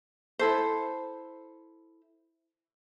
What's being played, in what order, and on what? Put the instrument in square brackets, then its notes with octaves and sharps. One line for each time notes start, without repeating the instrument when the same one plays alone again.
[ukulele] E4 A4 C5